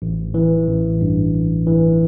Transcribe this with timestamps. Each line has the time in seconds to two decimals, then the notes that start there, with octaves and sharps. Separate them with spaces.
0.02 A1
0.34 E3
0.68 A1
1.01 G2
1.34 A1
1.67 E3